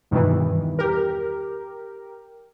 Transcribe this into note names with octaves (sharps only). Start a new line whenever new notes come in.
E2 G2 B2 D#3 E3
G4 A#4